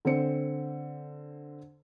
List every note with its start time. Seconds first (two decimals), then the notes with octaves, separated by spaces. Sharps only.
0.05 D3 C4 C5 C#7